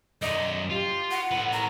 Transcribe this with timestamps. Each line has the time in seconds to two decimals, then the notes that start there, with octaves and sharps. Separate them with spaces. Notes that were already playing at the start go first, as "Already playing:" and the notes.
0.22 F#2 D5 D#5
0.70 F4 G4
1.11 F#5
1.31 A2 B4
1.53 A#5